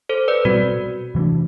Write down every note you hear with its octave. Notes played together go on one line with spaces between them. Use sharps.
A4 C5
B4 D5
B2 G3 C4 F#4
C3 E3 A3 D4